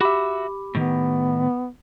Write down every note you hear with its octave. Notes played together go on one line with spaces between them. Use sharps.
F#4 G4 E5 B5 D6
A2 D#3 B3